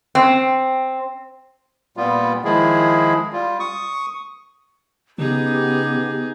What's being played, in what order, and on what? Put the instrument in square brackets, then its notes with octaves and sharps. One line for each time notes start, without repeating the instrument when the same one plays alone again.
[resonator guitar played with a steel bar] C4
[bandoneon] A#2 G3 B3 F4
D#3 F3 G#3 E4 G#4
G3 F4
C#6 D#6
[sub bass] C#3 [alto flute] B3 [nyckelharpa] D#4 G#4 [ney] G4